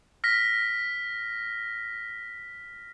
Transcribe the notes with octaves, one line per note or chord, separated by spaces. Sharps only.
F6 A#6 B6